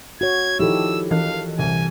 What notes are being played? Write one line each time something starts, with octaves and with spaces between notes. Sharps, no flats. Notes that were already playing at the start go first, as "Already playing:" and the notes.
F#4 C#5 G#6
D#3 F3 E4 G4 A4 E6
E3 F5
C2 G#5